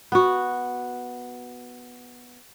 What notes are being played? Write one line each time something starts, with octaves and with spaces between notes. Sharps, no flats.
B3 F#4